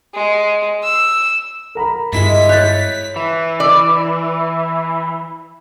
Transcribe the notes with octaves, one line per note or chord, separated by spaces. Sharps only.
G#3
E6
A#4 A#5 B5
G2 G#3 E4 E5 B6
C#5 F#6 G6 A6
E3
D5